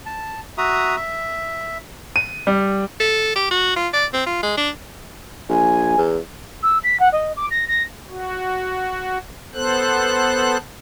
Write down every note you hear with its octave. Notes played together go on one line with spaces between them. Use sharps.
A5
F#4 E5 A#5 D#6
E5
D#7
G3
A4
G4
F#4
F4
D5
C4
F4
G#3
D4
A#1 G#5
E2
E6
B6
F#5
D#5
D6
A#6
A#6
F#4
B3 A4 C5 F#6